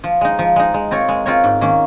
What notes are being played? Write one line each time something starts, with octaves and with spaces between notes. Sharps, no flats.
F3
G#3 D#4
F3
G#3 D#4
G#3
C4 F4 A#4 C#5
G#3
C4 F4 A#4 C#5
G#2
D#3 A#3 C#4